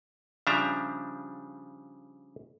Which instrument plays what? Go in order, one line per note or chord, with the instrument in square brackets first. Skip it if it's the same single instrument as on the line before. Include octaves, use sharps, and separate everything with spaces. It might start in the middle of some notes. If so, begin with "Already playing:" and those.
[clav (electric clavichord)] C#3 F3 G3 D4 E5 A#5